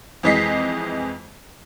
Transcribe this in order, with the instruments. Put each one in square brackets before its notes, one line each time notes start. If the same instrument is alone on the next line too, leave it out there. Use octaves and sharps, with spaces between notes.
[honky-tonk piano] F2 E3 G#3 D#5 B6 C7